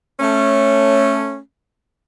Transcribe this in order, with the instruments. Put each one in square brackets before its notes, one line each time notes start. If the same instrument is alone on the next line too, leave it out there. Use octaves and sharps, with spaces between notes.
[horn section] A3 C#4